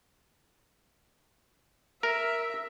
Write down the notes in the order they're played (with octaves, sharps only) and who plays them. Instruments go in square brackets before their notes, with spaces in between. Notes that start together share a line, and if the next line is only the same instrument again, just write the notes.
[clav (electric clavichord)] A#4 [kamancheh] E5